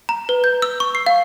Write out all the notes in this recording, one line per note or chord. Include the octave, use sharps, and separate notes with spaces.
A#5
B4
G6
E6
C#6
C7
F5